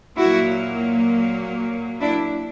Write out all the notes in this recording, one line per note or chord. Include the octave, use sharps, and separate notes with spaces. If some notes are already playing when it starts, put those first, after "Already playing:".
A#2 F#3 A#3 E4 F#4
D4 E4